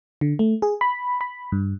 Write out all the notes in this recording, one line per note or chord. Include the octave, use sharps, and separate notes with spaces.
D3
A3
G#4
B5
B5
G2